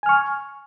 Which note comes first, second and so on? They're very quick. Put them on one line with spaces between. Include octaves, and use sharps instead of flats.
G#5 F6 C#6